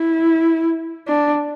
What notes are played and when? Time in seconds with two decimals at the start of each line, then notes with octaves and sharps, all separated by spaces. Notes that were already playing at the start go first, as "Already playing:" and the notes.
Already playing: E4
1.07 D4